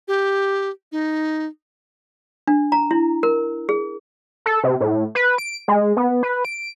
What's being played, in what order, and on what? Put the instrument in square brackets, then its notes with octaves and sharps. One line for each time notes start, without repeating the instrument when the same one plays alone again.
[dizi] G4
D#4
[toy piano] D4
A#5
E4
A#4
G#4
[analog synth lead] A4
C3
A2
B4
D7
G#3
B3
B4
D7